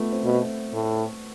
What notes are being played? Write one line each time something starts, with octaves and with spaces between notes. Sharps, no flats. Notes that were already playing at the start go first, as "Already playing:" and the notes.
Already playing: A3 B3
C4
B2
A2